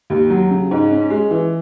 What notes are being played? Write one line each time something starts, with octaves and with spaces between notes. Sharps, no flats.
D#2
F#3
C#3
G#2
C#4
G#3
E3